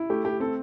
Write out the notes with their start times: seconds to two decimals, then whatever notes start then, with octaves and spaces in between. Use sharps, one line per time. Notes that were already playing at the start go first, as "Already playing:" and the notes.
Already playing: E4
0.10 A3 G4
0.25 A3 G4
0.40 C4 A4